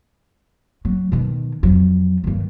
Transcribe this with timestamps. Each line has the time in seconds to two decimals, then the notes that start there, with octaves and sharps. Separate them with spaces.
0.85 F#3
1.12 B2 D#3
1.63 F2 F#3
2.24 G2 D#3